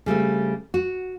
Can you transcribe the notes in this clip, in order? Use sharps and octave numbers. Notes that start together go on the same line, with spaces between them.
C#3 G3 A3 C4
F#4